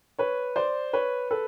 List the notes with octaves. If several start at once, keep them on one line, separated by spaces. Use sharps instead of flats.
B4 C#5
C5 D5
B4 C#5
A4 B4